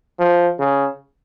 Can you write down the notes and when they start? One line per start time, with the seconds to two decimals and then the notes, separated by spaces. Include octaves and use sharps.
0.19 F3
0.60 C#3